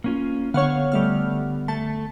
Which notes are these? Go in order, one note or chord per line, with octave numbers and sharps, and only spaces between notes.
A#3 C#4 F4
D3 B3 C#5 F5 F#5
G3 A3 F6
A3 A5